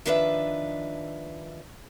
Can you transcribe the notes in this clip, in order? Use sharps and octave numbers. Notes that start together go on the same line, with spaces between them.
D#3 F3 D4 B4 D5 E5